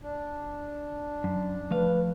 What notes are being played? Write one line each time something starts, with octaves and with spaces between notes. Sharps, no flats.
D4
F#2
F3 A3 B4 F5